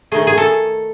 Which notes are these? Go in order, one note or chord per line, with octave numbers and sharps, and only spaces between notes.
D#3 A3 G#4
G#4
A4